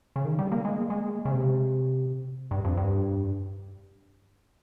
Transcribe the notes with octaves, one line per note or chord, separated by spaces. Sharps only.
C#3
D#3
G3
A#3
G#3
A#3
G#3
C#3
C3
G2
F2
G2